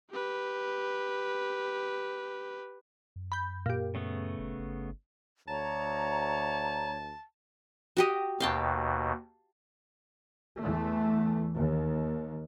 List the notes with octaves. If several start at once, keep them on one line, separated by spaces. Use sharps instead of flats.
G4 B4
F#2
B5 G6
A#2 G4
C#3 A3 B3
F#1
G1
D2 C#5 A5 A#5
F#4 G4 D#5
D#2 B2 F5 G5 A5
E2 E3 A3
D#2